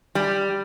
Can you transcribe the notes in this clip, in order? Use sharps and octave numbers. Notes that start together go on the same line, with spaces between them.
G3